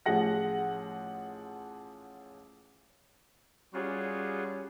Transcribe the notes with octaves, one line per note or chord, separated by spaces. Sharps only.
A1 F3 G#4 F#5 A#6
G3 C#4 F4 F#4 G#4